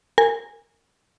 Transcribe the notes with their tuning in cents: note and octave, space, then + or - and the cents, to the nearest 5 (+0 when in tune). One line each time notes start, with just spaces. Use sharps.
A#4 -25 G#5 -15